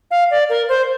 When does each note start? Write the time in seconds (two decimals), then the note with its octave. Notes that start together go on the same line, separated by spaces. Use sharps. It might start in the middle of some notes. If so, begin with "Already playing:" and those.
0.11 F5
0.31 D5
0.49 A#4
0.69 C5